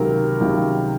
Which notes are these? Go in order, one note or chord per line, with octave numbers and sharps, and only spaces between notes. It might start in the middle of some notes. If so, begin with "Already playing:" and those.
Already playing: C#2 C3 D#3 F#3 A#4
C#2 C3 D#3 F#3